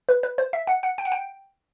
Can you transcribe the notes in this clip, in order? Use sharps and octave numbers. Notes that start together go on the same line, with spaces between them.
B4
B4
C5
E5
F#5
F#5
G5
F#5
G5